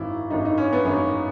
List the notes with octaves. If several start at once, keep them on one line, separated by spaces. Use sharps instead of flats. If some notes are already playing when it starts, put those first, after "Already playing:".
Already playing: G#1 F#2 D#3 E4
G#1 F#2 D#3 D#4
D#4
C#4
B3
G#1 F#2 D#3 C#4